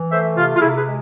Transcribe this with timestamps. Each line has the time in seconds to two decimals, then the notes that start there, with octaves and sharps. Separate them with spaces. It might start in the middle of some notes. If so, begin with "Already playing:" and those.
Already playing: E3
0.11 A3 C5 E5
0.36 C3 F4
0.56 F4
0.61 C3 E4 G#4
0.77 G#4 B4
0.86 G#3